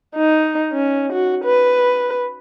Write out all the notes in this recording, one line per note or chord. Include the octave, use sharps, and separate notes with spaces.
D#4
C#4
F#4
B4